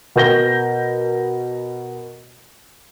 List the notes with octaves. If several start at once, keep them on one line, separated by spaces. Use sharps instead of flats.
B2 A#4 G6 A#6 G7